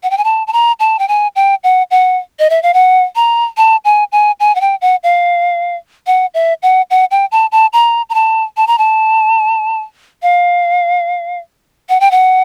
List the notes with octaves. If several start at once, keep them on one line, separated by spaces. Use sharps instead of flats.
F#5
G5
G#5
A5
A5
A#5
A5
G5
G#5
G5
F#5
F#5
D#5
E5
F5
F#5
A#5
A5
G#5
G#5
G#5
F#5
G5
F#5
F5
F#5
E5
F#5
F#5
G5
A5
A5
A#5
A#5
A5
A5
A#5
A5
F5
F#5
G5
F#5